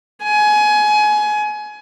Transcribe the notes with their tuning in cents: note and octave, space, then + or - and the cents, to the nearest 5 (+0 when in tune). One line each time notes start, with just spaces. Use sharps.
G#5 +25